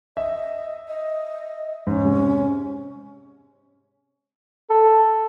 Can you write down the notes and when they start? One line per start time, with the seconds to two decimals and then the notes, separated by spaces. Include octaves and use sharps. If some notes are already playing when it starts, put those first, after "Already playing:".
0.17 D#5 E5
0.88 D#5
1.87 G#2 C#4
2.04 C3 G#3
4.70 A4